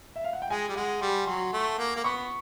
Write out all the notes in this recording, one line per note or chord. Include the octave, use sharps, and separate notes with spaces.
E5
F5
F#5
G5
G#3 G#5
G3
G#3 F#5
G3 C6
F#3 C6
A3
A#3
A#3
B3 C#6